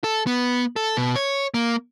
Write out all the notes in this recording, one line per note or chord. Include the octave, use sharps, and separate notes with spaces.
A4
B3
A4
B2
C#5
A#3